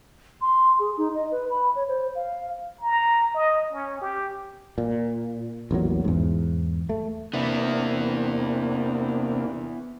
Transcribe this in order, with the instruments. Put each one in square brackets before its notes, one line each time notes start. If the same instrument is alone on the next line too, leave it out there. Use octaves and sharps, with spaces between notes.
[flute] C6
G#4
D#4
D#5
B4
B5
C#5
C5
F5
[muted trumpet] A#5
D#5
C#4
G4
[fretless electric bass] A#2
A1 E2 A#2 F#3
E2 G#2
A3
[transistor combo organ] C3 A#3 D4 [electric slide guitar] B3 E4